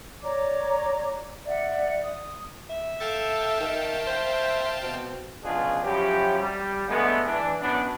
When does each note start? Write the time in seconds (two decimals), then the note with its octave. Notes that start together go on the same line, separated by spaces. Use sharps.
0.23 C#5 D5 A#5 D6
1.46 D5 E5 F#5
2.03 D#6
2.69 E5
3.00 A4 F5 G5 A5
3.60 D#3 E5
4.07 C5
4.82 B2 C4
5.44 C#2 B2 F3 D4 F4 G#4
5.84 F3 F#3 C#4 E4 G4
6.39 G3
6.88 D3 G#3 A3 B3
7.26 E3 D4
7.61 F#2 B3 D4